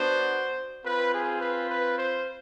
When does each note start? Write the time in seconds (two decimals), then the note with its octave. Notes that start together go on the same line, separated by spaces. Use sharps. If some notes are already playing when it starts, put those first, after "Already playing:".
Already playing: B3 D4 F#4 C5
0.84 C4 F4 B4
1.13 G#4
1.41 B4
1.70 B4
1.99 C5